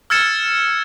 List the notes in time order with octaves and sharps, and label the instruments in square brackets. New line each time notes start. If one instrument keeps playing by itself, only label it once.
[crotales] E6 F6 G#6 A6 C#7 E7